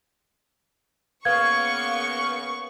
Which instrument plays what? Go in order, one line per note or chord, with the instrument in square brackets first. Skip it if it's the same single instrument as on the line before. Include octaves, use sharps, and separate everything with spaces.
[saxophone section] C#3 A#3 B3 [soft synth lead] F5 [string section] C#6 [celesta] G#6